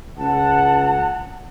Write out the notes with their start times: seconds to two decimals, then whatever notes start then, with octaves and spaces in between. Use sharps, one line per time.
0.18 C#2 F#5 A5